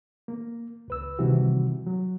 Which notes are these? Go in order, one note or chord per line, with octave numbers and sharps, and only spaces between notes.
A#3
C#2 B4 E6
C3 D#3 E3 G3 F#4
F#3